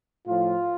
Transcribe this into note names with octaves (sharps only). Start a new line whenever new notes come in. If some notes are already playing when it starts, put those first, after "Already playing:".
A2 F3 F4